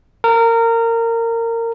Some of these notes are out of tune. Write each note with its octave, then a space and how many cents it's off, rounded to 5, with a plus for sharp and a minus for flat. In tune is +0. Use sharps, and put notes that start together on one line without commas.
A#4 -20